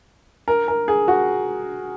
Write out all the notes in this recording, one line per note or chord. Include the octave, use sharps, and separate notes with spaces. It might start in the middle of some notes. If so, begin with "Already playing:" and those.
A#4
A#4
G#4
F#4